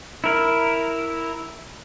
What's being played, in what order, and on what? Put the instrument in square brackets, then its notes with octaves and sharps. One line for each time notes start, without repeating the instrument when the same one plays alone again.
[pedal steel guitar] E4 A#4